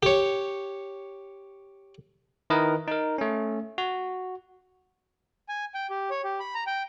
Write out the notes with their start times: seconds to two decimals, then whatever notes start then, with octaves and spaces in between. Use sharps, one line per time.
0.03 G4 C#5
2.50 D#3 E4 A#4 B4 D#5
2.88 D#4 A#4
3.18 A3 C#4
3.78 F#4
5.49 G#5
5.74 G5
5.90 G4
6.10 C#5
6.24 G4
6.40 B5
6.55 A#5
6.67 G5